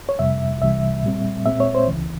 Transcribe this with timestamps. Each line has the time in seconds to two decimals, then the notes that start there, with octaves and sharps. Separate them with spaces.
0.09 C#5
0.19 F2 C3 G3 E5
0.61 C2 C3 E3 G3 E5
1.04 A#2 G3 C4
1.46 A#2 G#3 C4 E5
1.60 C#5
1.75 C5
1.88 C#2 C#3 E3